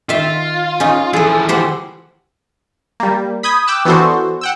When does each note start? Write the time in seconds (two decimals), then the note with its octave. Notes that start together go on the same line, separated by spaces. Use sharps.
0.09 D#3 F4 E5
0.80 C#4 D#4
1.13 E3 F3 G#4 A4
1.49 G4 C5 F#5
3.00 G3 A#3
3.43 B5 D#6 G6 G#6 B6
3.67 G5 D6 E6 F#6
3.85 E3 B3 D4 F#4 A4 C5
4.41 F#5 G5 E6